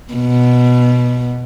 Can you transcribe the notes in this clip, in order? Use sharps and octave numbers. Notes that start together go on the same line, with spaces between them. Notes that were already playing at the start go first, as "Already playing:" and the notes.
B2